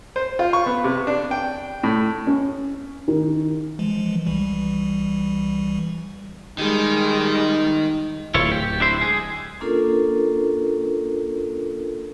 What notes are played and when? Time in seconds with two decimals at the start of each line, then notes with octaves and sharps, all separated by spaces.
0.16 C5
0.39 F4
0.53 C#6
0.66 B3
0.84 C3
1.07 D4
1.31 G5
1.83 A2
2.27 C#4
3.08 D#3
3.79 E3 F3 G#3
4.26 C2 E3 G3
6.58 D#3 G3 G#3 D#4
8.34 D1 E4 F4 C#5
8.51 G4
8.80 D4 E4 C5
9.01 G#3 G#4
9.61 A#3 C#4 D4 F4 A4 A#4